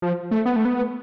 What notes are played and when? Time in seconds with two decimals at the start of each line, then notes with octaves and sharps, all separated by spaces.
0.02 F3
0.31 A3
0.46 B3
0.56 A3
0.65 B3